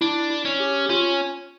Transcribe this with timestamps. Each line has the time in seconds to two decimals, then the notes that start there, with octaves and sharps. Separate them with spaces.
0.01 D4 E4
0.30 E4
0.45 C#4
0.60 G4
0.86 G4
0.90 C#4 F4